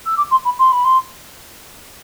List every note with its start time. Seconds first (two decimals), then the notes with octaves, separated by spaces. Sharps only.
0.06 E6
0.17 D6
0.31 C6
0.44 B5
0.59 C6
0.72 B5
0.84 C6